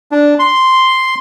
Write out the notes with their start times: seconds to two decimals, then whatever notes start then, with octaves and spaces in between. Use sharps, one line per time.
0.12 D4
0.39 C6